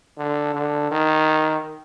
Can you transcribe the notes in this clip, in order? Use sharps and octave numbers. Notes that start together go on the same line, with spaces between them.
D3
D3
D#3